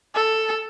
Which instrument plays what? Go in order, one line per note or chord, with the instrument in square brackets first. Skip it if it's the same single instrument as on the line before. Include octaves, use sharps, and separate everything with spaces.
[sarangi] A4